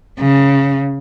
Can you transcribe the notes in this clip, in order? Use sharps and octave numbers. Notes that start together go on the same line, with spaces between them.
C#3